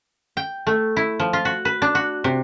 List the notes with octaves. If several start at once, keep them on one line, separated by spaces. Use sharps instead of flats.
G5
A3
E4
F3
F4
F#4
B4
D4
F#4
C3